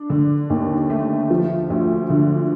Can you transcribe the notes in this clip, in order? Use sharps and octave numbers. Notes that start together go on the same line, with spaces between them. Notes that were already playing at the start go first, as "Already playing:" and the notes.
Already playing: D4
D3
D#2
A3
F3
D2
D3